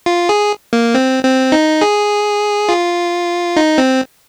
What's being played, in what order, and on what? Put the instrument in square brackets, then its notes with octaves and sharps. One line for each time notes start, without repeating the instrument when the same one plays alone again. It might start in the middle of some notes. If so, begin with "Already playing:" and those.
[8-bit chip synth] F4
G#4
A#3
C4
C4
D#4
G#4
F4
D#4
C4